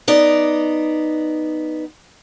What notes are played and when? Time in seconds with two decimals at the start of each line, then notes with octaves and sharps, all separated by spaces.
0.08 B3 D#4 D5